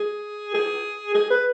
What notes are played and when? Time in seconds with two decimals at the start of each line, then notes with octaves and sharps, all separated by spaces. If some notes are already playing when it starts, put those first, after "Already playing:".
Already playing: G#4
0.54 G#4
1.14 G#4
1.30 B4